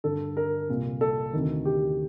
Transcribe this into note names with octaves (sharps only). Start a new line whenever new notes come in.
G2 D3 A4
A#4
C2 A#2
A4
D2 C3 D#3
G4